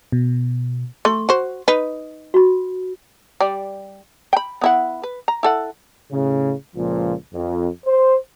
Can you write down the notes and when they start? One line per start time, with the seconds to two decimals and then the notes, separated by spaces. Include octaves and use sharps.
0.12 B2
1.05 A3 C6 C#6
1.29 F#4 C5
1.68 D#4 B4
2.34 F#4 B5
3.40 G3 D5
4.33 G5 B5
4.61 B3 E4 F#5
5.03 B4
5.28 A#5
5.43 E4 A4 F#5
6.11 A2 C#3
6.75 C#2 A#2 F3
7.32 F2
7.86 C5